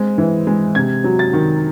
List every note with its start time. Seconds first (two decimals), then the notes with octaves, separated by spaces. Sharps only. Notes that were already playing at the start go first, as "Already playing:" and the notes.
Already playing: G#3 C4
0.18 E3
0.47 G#3
0.75 C3 G#6
1.04 F#3
1.19 A6
1.33 D#3